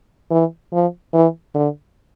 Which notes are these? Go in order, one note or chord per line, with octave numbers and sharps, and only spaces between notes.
E3
F3
E3
D3